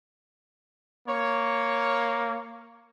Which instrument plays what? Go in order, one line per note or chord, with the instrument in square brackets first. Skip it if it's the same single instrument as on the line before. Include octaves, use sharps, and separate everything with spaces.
[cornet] A#3 [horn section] C#5